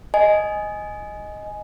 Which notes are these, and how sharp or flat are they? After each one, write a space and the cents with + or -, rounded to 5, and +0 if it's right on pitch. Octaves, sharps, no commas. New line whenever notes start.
D#5 +0 G#5 +5